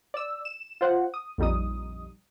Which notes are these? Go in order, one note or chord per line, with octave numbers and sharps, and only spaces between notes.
D5 E6
E7
F4 C5 F#5
D#6
A#1 F2 G3 D#4 D#6